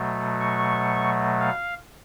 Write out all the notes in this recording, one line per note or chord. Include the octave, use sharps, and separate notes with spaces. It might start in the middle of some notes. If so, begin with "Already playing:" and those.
Already playing: B2 F#3 A3
C#6
F5